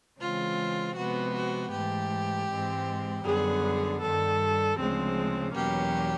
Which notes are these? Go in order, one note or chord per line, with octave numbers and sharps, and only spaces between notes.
C#3 E3 G#3 C4 F4
C3 F3 G#3 B3 F#4
F#4
G#2 E3 A3 G4
G#2 E3 G#3 C4
F#2 D3 G3 B3 G#4
G2 D#3 G3 A4
D2 C#3 F3 G#3 C4
E2 B2 F#3 A#3 C#4 G4